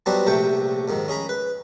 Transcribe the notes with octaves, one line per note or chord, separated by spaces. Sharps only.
F#3 G3 B3 C4 D4 F#4
A#1 C3 A3 G5 C#6
F2 G#2 D#3
C#4 G#4 A#5 B5
B4